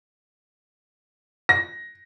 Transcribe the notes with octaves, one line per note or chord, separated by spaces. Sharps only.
A#6